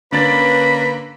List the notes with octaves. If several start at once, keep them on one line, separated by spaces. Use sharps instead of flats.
D3 A#3 C#4 D4 B4 B5 A6